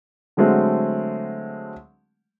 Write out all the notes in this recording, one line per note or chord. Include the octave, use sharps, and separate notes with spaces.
D3 F#3 G#3 A3 C4